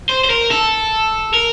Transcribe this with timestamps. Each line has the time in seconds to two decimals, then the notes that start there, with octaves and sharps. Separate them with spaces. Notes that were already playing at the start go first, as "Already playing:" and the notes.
0.09 C5
0.24 C5
0.30 A#4
0.51 A4
1.34 A#4